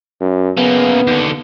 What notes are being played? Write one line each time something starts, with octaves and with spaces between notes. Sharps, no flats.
F#2
C#3 A#3 B3
D#2 D3